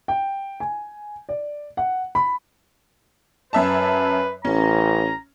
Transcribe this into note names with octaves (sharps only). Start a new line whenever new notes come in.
G5
G#5
D5
F#5
B5
F#2 B4 E5 A5
A1 C#4 A#5